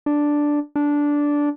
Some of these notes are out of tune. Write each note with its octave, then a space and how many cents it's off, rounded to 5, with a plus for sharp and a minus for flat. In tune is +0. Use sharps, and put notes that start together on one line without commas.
D4 +0
D4 -10